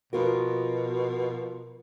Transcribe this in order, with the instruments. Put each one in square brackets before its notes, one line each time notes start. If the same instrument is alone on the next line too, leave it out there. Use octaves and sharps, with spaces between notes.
[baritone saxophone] B2 [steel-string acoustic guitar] F3 F4 A#4 [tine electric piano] F#4